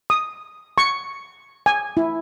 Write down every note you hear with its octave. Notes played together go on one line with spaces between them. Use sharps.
D#6
C#6
G#5
E4